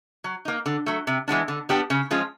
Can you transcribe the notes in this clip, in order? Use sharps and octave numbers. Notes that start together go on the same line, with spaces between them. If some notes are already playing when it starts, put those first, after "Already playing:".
F#3
A#3 D#4
D3
F#3 A3
C3
E3 G#3 B3 D4
D3
G3 B3 D4 G4
C#3
F3 G#3 C#4 F4